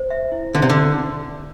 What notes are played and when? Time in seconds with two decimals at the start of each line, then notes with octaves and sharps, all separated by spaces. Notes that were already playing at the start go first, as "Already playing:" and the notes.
Already playing: C5
0.10 E5
0.32 E4
0.55 D3 E5
0.62 C3
0.70 D3
0.77 A5